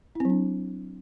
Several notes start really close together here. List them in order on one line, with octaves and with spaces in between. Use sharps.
E4 C4 F#3 D4